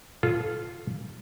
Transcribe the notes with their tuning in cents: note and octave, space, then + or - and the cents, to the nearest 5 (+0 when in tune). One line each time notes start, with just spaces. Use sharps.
F4 +0 A4 -25